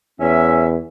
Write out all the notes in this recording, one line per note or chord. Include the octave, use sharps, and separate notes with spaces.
E2 C#4 E5